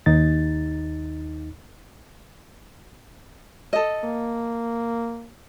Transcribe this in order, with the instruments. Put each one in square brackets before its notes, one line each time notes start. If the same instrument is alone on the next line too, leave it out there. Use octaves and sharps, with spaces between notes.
[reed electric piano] D#2 D#4 A6
[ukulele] A4 D#5
[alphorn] A#3